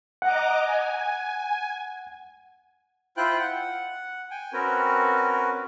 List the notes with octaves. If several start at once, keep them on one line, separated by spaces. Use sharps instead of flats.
D#5 F#5 A#5 D6
G#5
E4 F4 C5 G5 F#6
F#5
G5 G#5
C4 C#4 F#4 A#4 B4